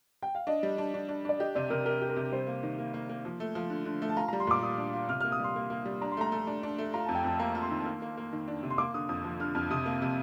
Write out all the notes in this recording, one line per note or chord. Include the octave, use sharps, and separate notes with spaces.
G5
F5
D4 D#5
G3
D4
D4
D4
D4 D5
G4 D#5
C3 D5
C3 A#4
G4 A#4
G4
A#4
C3
G3 C5
A#3
D#3
A#3
A#3
A#3
F3
A3
F3
D3
D3
A3
A5
F4 A#5
A#5
G3
C6
A#2 D6
G3 D#6
D4
F4
C3 F6
F6
A#3
D#6
G3 C6
A#3
A#3
G3
D4 A#5
C6
A3 A#5
A3
D4
D4
A3
F4 A#5
F2 A5
G5
F2 A5
A#3 A#5
F4
C6
D#3
A#3
A#3
A#3
D#3
D4
C3
C6
A#3 D6
D3 D#6
F2 D#6
F3
D3 F6
F2 F6
C3 D#6
A#3
C3